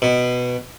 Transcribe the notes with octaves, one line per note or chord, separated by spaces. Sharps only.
B2